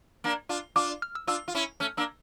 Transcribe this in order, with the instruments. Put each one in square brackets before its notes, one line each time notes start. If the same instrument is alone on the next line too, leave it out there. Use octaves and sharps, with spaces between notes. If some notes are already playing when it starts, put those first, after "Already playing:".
[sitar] A#3 D4
D4 F4
[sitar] D4 F4 [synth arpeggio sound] D6
[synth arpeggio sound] F6
E6
[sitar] D4 F4 [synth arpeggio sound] E6
[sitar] F4
C#4 E4
[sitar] A3 C#4 [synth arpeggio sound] F6
[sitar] A#3 D4 [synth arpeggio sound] E6